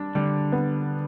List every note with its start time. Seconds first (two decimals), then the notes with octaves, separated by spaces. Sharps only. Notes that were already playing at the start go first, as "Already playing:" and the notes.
Already playing: G3 D4
0.15 D3 G3
0.52 B3